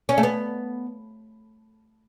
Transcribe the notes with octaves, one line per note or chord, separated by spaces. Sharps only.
C#4
A3
B3